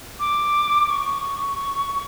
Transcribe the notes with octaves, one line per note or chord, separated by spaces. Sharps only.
D6
C#6